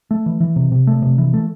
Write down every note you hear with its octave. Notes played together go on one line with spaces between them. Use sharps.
A3
E3
E3
C3
C3
A3
C3
E3
A3